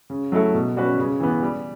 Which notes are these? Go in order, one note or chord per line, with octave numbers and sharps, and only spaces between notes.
C#3
F#3 A3 E4 A4
B2
G3 C#4 F#4 B4
C#3
E3 B3
G3